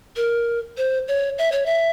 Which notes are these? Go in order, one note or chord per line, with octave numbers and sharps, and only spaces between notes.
A#4
C5
C#5
E5
C#5
E5